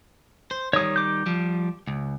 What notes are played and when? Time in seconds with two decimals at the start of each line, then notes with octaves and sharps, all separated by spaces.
0.51 C5
0.73 D#3 G3 C#5 D#6
0.96 D6 G6
1.26 F3 G3
1.87 C#2